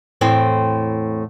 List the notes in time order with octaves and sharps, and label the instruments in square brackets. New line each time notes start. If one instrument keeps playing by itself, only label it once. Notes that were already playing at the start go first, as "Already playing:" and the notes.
[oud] E2 A2 C4